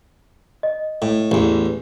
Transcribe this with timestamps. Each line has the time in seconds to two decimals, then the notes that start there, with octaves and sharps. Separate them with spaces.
0.63 D#5
1.02 A2
1.32 A1 E2